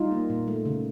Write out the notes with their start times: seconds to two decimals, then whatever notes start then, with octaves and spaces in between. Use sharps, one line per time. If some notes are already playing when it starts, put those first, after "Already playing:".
Already playing: G3 D#4 F4
0.11 A#3
0.30 A#2
0.48 A3
0.65 C#3